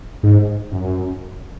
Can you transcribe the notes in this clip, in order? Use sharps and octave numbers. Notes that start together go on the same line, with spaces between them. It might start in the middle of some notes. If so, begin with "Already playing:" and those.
G#2
F#2